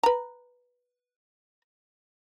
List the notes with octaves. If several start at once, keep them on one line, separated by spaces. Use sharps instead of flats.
B4 A#5